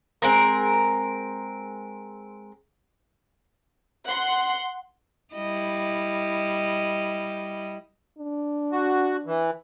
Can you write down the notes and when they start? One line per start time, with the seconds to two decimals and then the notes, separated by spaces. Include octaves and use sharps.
0.22 G#3 C4 A#4
4.07 F#5 C6
5.34 G3 E4 D#5
8.18 D4
8.72 F#4
9.26 E3